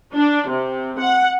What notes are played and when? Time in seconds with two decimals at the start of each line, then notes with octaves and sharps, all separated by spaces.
0.14 D4
0.49 C3
0.99 F#5